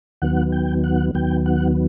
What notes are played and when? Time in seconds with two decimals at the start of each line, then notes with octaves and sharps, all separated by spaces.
0.22 D#2 D#3 F#3 B3 F#5
0.52 G5
0.84 F#5
1.14 D#2 D#3 F#3 B3 G5
1.46 F#5